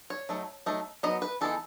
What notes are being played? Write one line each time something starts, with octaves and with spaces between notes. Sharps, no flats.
C#5
F#3 A3 D#4
F#3 A3 D#4
F#3 B3 D#4 D#5
B4
E3 G#3 B3 D#4 A4